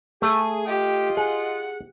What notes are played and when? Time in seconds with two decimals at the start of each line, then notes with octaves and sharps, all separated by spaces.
0.22 A3 G#4
0.67 F4 G4 D#5
1.17 G#4 F#5